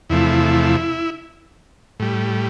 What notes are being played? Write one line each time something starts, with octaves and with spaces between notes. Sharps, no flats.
E2 C3 F3 A3 E4
A2 G3